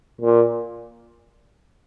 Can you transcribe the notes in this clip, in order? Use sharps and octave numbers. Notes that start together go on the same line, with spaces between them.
A#2